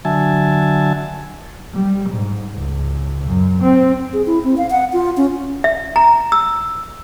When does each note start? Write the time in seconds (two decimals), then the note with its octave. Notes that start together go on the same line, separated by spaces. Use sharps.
0.05 D3 F#3 E5 G#5 A5
1.74 G3
2.10 G#2
2.58 C#2
3.26 F#2
3.62 C4
4.13 G#4
4.26 E4
4.44 C4
4.58 F5
4.70 F#5
4.93 F4
5.17 C#4
5.64 E5
5.96 A#5
6.32 E6